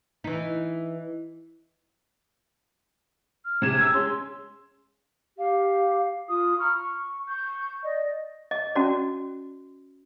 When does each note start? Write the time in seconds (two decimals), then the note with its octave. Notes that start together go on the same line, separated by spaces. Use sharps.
0.24 E3 D#4
3.45 F6
3.62 C3 G#3 G#6 E7
3.81 E6 G#6
3.94 G#3 C#4 C6
5.37 G4 F5
6.28 F4 D#6
6.60 A#5 B5 C#6 F6
6.80 C#6
7.29 C#6 G6
7.84 D5 D#5
8.51 D#5
8.76 C#4 F#4 D5